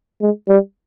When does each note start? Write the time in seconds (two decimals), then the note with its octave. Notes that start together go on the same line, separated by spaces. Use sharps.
0.21 G#3
0.49 G3